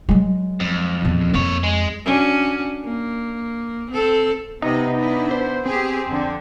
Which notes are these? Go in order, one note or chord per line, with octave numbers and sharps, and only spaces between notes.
F#3 G#3
F2
E2 A#2
F2 A#2 C#5
G#3
C#4 D4 F#4
A#3
C4 A4
C3 B3 D#4 D#5
D4 E4
C5
C4 G4 G#4
F2 D3